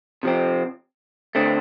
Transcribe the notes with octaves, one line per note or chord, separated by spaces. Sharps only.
C3 F3 C4
D3 A3 C4